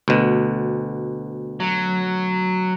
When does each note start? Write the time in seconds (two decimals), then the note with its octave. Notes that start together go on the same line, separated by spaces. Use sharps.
0.08 D2 B2
1.60 F#3